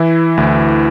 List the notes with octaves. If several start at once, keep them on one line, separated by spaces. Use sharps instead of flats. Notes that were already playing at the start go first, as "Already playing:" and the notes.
Already playing: E3 E4
D2